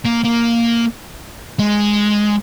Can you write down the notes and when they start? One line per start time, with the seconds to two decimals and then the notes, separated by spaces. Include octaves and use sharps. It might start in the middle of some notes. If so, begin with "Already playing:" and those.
0.06 A#3
0.25 A#3
1.59 G#3